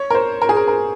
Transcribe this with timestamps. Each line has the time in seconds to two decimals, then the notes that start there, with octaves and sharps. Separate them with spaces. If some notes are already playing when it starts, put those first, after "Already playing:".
Already playing: C#5
0.10 A#4
0.15 C5
0.42 A#4
0.49 G#4
0.57 A#4
0.68 A#4